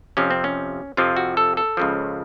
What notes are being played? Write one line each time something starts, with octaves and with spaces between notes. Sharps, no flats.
F2 C3 F3 C#4
C4
C#4
F2 C3 F3 F4
F#4
A4
A4
C#2 C#3 F3